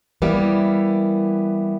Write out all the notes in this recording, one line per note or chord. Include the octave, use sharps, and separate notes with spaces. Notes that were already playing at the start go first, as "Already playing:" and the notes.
E3 G3 A#3 B3